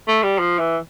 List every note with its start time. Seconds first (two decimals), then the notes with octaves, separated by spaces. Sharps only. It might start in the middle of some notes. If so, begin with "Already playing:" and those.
0.08 A3
0.23 G3
0.39 F3
0.59 E3